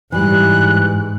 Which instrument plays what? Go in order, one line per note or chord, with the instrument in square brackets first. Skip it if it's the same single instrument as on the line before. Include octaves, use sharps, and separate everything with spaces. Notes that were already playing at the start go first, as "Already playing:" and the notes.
[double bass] G#2 [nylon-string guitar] E3 G3 [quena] F#6